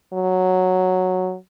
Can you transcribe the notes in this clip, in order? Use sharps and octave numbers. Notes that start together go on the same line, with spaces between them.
F#3